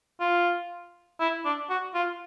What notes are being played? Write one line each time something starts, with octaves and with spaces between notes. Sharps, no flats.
F4
E4
D4
F#4
F4